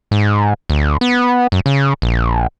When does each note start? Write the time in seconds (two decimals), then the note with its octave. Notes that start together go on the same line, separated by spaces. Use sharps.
0.11 G#2
0.70 D2
1.01 B3
1.52 F#2
1.66 C#3
2.02 A#1